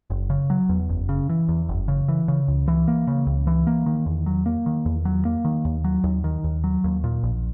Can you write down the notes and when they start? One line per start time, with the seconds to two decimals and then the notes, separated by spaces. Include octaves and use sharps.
0.10 F#1
0.30 C#3
0.50 F#3
0.69 E2
0.89 F#1
1.09 C#3
1.29 E3
1.48 E2
1.69 F#1
1.88 C#3
2.08 E3
2.28 C#3
2.48 C#2
2.68 E3
2.88 A#3
3.07 C#3
3.27 C#2
3.47 E3
3.67 A#3
3.86 D#3
4.06 E2
4.26 F#3
4.46 A#3
4.66 D#3
4.86 E2
5.05 F#3
5.25 A#3
5.45 D#3
5.65 D#2
5.84 F#3
6.04 D#2
6.24 D#3
6.44 D#2
6.64 F#3
6.84 D#2
7.04 A#2
7.23 A#1